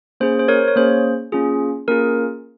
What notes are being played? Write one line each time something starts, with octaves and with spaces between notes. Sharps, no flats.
A#3 C#4 G#4 C5
C5
A#4 C#5
C#5
A#3 C#4 G#4 C5
A#3 C#4 F4 G#4
A#3 C#4 F4 G#4 A#4